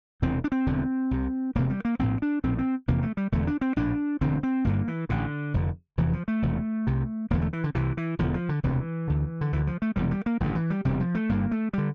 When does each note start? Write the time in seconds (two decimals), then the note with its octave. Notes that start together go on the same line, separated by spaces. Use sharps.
0.22 E1 E2 C3 C4
0.44 D4
0.52 C4
0.66 E1 E2 D3
1.11 C2 C3
1.55 E1 E2 C3 A#3
1.70 G3
1.85 A#3
1.99 A#1 A2 C4
2.22 D4
2.43 A#1 A2 C4
2.58 C4
2.88 F1 E2 C3 A#3
3.02 A3
3.17 G3
3.32 E1 E2 D3 A3
3.47 D4
3.61 C4
3.76 A#1 A2 D4
4.21 E1 D2 D3 C4
4.43 C4
4.64 G1 G2 D3 A#3
4.88 E3
5.09 A1 A2 D3
5.54 F1 F2 D3
5.97 F1 E2 C3 E3
6.13 F3
6.28 A3
6.42 E1 E2 C3
6.87 C2 C3
7.30 E1 E2 D3 A#3
7.42 A3
7.53 E3
7.64 D3
7.75 C2 C3 E3
7.97 E3
8.19 E1 E2 D3 F3
8.34 F3
8.49 D3
8.63 E1 D2 C3 E3
9.08 D2 D3
9.41 D3
9.52 D2 D3 E3
9.67 F3
9.82 A3
9.96 E1 E2 C3 G3
10.11 G3
10.26 A#3
10.40 A1 G2 D3 E3
10.55 E3
10.70 G3
10.85 E1 D2 C3 G3
11.00 F3
11.15 A3
11.29 G1 G2 D3 A#3
11.51 A3
11.73 D3 G3